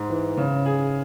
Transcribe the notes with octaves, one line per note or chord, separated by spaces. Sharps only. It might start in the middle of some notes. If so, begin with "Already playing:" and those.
Already playing: G#2
E3
C#3
G#4